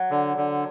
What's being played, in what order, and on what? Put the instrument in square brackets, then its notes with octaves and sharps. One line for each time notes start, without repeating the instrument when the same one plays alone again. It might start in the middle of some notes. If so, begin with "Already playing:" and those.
Already playing: [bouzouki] F#3
[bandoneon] D3
D3